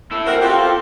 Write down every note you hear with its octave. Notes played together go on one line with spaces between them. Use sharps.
E4 A4
C4 F#4 A#4
F4 G4 A4